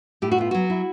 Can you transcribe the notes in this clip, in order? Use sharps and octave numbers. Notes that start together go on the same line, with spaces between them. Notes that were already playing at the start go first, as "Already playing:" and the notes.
A2 G4
F#4
B3 F4
F#3 F#4
E4